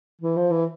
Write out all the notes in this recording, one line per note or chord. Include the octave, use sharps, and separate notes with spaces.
E3
F3
E3